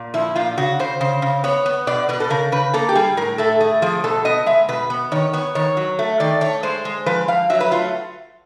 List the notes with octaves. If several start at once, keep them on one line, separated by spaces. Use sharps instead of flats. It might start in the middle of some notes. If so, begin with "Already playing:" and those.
Already playing: A#2
F3 E4
A#2 F4
C#3 F#4
C#3 C5
C#3 C5
C#3
B3 C#5
B3
B2 D5
B2 B4
A4
C#3 A#4
C#3 B4
A#3 A4
G4
G3 G#4
A2 A#4
A3 A4
A3 G#4
F3 G#4
B2 A4
B3 D#5
G#3 E5
B2 B4
B3
D#3 C#5
B3 C#5
D#3 C#5
F#3
A3
D#3 D5
A3 C#5
G#3 C5
G#3
F3 B4
F3 F5
F#3 E5
B4
A3 F4